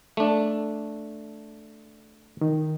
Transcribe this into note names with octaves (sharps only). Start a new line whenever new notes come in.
A3 D4
D#3